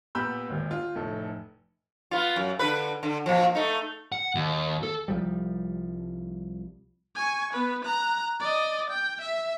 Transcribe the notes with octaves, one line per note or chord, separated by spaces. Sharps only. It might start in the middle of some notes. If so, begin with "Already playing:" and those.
A#2 B3 G4 B5 E6 G6
G#1 D#2 A#2
F4
F1 A2 A4
B3 F4
F#2
D3 B4
D3
A#2 F3
A3 D#4
F#5
D#2
A4
C2 F3 G3
G#5 C#6
B3 B4
A#5 F#6
D5 D#5
G5
E5